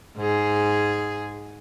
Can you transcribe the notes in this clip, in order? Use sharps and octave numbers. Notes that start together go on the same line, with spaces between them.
G#2 G#4